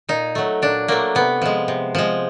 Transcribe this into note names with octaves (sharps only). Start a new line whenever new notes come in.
A#2 D#4
F#3 A3
A#2 D4
F#3 A3 A#3
C3 B3
F3 G#3
C3
F3 G#3